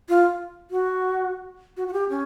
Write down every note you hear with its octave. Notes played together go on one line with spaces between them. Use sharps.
F4
F#4
F#4
F#4
G4
C#4